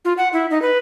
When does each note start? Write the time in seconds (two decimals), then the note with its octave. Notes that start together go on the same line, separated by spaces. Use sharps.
0.05 F4
0.18 F#5
0.33 E4
0.51 D#4
0.62 B4